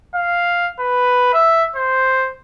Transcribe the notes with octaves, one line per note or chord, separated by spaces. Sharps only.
F5
B4
E5
C5